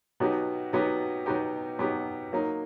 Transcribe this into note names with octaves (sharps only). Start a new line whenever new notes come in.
B2 F#3 B3 D#4 G4
B2 F#3 B3 D#4 G4
B2 F#3 B3 D#4 G4
B2 F#3 B3 D#4 G4
F#3 A#3 D#4